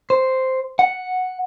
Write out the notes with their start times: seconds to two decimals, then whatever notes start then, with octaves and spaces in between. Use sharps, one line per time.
0.10 C5
0.79 F#5